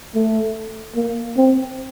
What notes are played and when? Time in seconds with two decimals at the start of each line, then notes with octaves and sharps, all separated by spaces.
0.15 A3
0.96 A#3
1.37 C4